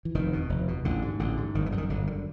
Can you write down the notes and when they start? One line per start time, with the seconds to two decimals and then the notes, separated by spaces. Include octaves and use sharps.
0.05 E3
0.15 F1 D#3
0.32 E2 B2
0.49 F1
0.67 E2 B2
0.85 A1 D3
1.02 G#2
1.19 A1 D3
1.37 G#2
1.54 G1 D#3
1.66 E3
1.72 F#2 D3
1.78 D#3
1.89 G1 D3
2.07 F#2 D#3
2.12 D3